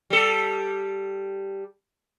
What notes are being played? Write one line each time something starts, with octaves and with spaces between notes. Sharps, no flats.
G3 A4